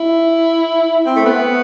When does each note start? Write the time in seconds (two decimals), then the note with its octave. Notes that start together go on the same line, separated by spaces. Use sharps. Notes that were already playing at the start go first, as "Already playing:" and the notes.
Already playing: E4
1.06 C4
1.16 A3
1.26 B3